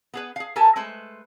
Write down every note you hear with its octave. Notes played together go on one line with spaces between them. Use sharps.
B3 G#4 B4
G#4 F5
G4 A4 A#4 G#5 A5
G#3 A3 B4 C5